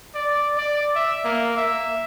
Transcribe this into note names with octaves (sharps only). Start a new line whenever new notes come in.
D5
D5
E5
A#3
E5